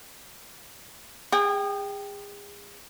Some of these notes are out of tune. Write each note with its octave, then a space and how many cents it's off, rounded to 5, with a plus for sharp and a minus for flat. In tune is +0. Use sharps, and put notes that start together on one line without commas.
G#4 -35 G5 +0